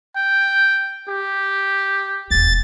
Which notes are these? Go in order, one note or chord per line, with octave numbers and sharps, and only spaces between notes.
G5
G4
E1 D#2 A6